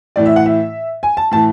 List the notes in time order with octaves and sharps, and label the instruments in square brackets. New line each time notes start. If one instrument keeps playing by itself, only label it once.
[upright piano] A2 E3 D5
E5
F#5
E5
G#5
A5
A2 E3 A5